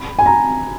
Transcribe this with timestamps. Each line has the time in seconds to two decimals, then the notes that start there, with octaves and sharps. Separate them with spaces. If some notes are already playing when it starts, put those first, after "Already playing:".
Already playing: B5
0.19 G#5
0.26 A#5